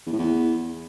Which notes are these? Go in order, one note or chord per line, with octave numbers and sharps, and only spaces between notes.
E2
A2
E2